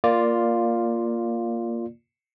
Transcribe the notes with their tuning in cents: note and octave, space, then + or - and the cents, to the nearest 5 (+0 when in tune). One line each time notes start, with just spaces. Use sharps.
A#3 +0 F4 +0 D5 +0